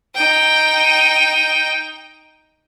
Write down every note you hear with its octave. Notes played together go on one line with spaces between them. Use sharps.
D#4 G5